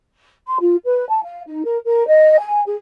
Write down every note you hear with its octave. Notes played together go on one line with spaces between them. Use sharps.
C6
F4
B4
A5
F5
D#4
A#4
A#4
D#5
G#5
G#4